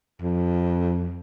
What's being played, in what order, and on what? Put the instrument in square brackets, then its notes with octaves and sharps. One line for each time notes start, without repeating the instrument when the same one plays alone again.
[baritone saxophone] F2